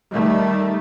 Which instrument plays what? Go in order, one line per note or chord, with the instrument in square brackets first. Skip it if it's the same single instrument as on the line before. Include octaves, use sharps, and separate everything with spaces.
[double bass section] D#3 G3 A3